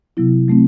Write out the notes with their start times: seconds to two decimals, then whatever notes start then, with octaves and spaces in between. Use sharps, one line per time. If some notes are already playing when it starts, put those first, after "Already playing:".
0.17 C3 F#3 B3 E4
0.48 F#3 A3 C4